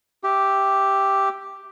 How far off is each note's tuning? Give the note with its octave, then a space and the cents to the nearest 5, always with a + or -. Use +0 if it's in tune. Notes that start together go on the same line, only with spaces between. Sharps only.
G4 +0 E5 +0